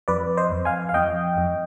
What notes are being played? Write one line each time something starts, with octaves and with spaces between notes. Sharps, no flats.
F2 B4 D5
C5 D#5
F2
F5 G#5
F5
F2 D#5 G5
F2